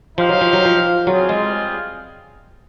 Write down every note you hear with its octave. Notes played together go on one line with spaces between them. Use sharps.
F3 D#4 G4 C5 F5
F#3
F3
F#3
F3
F#3 G3 C4 F4 G#4
G#3